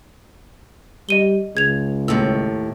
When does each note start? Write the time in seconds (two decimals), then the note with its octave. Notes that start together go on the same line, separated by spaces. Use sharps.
1.09 G3 D#5 D#7 G7
1.55 C#2 G#4 G#6 F7
2.08 D#2 A2 E6